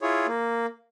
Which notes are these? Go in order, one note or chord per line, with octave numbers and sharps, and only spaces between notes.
E4 F4 G#4 C#5
A#3